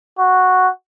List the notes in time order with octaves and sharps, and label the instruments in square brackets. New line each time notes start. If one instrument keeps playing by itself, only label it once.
[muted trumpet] F#4